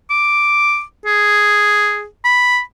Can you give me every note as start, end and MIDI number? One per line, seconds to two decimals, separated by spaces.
0.10 0.82 86
1.06 2.05 68
2.25 2.60 83